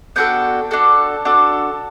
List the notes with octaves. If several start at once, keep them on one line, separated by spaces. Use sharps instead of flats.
B3 D4 F#4 A4 G5
D4 F#4 A4
D4 F#4 A4